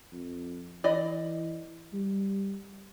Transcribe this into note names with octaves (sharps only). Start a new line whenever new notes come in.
F2
E3 D5 D#5 B5
G3